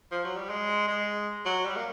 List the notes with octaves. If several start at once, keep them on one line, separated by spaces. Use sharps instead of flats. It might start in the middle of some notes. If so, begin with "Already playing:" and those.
F3
F#3
G3
G#3
G#3
F#3
G3
A#3